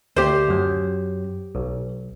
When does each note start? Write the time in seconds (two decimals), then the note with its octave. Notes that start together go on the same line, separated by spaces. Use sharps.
0.16 D2 G4 C5
0.49 F#2 F#3
1.55 B1